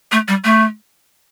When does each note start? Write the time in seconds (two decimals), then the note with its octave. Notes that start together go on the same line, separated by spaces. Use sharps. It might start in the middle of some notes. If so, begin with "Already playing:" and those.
0.12 A3
0.28 G3
0.44 A3